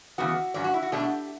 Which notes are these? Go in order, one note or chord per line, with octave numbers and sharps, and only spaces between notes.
E2 C#3 G3 B3 F#4
G2 F#3 C#4 D5
F#4
E4
F#4
B2 A3 D4 G4